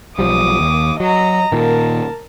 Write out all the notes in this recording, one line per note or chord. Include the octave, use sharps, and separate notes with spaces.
B1 F3 G3 D6 D#6
D#2
F#3 D#5 A#5
A#2 D#3 A#4 A5